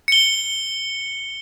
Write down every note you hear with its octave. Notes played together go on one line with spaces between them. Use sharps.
C#7 G7